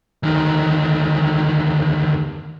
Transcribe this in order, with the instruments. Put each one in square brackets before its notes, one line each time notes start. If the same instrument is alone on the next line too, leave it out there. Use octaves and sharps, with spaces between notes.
[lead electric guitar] D2 D#3